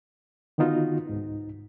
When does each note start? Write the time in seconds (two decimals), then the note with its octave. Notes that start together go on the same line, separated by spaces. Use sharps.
0.58 D3 D#3 B3 D#4 F4 F#4
1.07 C2 G#2 D#4